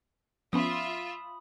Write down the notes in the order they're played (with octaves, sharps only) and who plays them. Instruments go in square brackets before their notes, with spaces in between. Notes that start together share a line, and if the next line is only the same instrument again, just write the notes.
[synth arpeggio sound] F3 B3 C#4 [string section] F4 E5 [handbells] B5 D#6